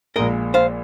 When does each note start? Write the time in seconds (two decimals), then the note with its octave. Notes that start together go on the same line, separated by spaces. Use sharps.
0.16 A#1 A#2 G#3 A#4 D#5
0.54 C5 F5